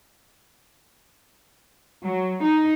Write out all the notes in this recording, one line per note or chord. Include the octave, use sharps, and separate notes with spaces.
F#3
D#4